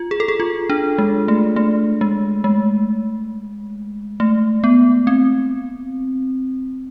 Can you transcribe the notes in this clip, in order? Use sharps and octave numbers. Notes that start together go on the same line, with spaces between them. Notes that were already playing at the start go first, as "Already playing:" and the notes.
Already playing: F4
G#4
A4
G#4
F4
D4
G#3
A3
A3
G#3
G#3
A3
B3
C4